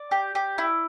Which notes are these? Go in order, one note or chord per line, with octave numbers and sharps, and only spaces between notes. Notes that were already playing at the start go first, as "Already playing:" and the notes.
Already playing: D5
G4
G4
E4